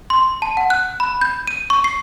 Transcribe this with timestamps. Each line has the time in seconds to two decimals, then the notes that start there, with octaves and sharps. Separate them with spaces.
0.10 C6
0.42 A5
0.57 F#5
0.70 F#6
1.00 B5
1.21 G6
1.47 D#7
1.70 C#6
1.84 C7